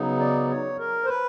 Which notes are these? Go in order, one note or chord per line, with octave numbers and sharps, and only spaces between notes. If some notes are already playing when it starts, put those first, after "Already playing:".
Already playing: C#3 F#3 B3 D#4
D5
C#5
A#4
C5
B4